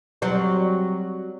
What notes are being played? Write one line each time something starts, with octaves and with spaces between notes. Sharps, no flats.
F#3 G3 C4